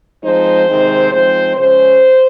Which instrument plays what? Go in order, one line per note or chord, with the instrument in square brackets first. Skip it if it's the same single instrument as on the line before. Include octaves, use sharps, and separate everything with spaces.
[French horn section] F3 G#3 C4 D#4 C5
C3 D#3 G#3 C4 D#4
F3 G#3 C4 D#4 C5
C#3 F3 G#3 C#4 C5